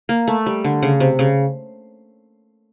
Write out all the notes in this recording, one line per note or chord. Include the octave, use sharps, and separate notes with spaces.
A#3
A3
G3
D3
C#3
C3
C#3